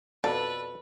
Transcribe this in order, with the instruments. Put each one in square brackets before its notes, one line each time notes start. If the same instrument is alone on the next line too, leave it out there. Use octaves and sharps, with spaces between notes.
[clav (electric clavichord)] F2 B2 F3 [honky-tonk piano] A4 [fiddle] B4 [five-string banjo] D5